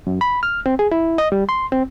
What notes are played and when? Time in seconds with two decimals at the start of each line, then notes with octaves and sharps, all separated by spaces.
0.07 F#2
0.21 B5
0.43 F6
0.66 C4
0.79 G#4
0.91 E4
1.18 D#5
1.32 G3
1.49 C6
1.72 C4